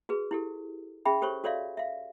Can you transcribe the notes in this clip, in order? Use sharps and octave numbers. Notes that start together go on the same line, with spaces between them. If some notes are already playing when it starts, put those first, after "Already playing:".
F#4 G#4 B4
E4 G4 A4
C#4 G#4 E5 G5 B5
G4 A4 C5 C#5 C#6
F#4 A4 C#5 D5 E5 F5
E5 F5